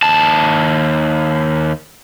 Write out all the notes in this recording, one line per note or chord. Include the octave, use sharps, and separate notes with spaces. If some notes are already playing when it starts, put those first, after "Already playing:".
D#2 A5